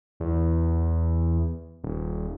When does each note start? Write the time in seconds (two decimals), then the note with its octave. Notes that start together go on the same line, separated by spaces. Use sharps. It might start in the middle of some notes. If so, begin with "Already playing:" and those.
0.20 E2
1.84 D#1